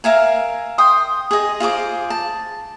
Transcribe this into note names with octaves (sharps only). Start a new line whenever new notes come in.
A#4 E5 F5 G#5
G5 C6 D#6
G#4 D#5
F4 G#4 C5 D6
A5